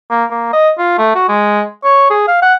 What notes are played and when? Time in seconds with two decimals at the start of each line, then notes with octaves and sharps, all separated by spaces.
0.10 A#3
0.31 A#3
0.53 D#5
0.78 F4
0.98 A3
1.15 F#4
1.29 G#3
1.84 C#5
2.10 G#4
2.28 F5
2.42 F#5